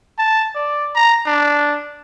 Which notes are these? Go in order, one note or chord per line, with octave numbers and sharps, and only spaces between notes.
A5
D5
A#5
D4